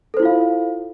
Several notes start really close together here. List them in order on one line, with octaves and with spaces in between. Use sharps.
A4 C5 E4 F4 F5